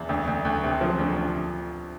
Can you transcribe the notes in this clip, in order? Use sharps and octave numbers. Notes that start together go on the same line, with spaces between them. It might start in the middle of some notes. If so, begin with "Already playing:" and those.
Already playing: E2
D2
D2
D2
C3
F3
D2